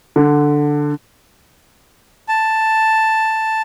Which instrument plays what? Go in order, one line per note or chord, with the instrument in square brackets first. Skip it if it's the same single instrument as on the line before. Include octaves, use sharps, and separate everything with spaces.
[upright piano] D3
[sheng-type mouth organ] A5